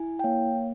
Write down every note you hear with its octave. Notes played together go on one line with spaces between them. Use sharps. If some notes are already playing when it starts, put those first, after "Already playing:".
Already playing: E4 G#5
G5
A#3 C#5 F5